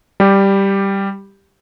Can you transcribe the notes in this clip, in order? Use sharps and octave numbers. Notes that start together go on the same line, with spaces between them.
G3 G4